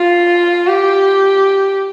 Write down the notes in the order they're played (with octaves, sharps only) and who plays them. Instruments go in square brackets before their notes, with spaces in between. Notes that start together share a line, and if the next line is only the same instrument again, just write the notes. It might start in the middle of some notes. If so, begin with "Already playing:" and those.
Already playing: [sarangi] F4
G4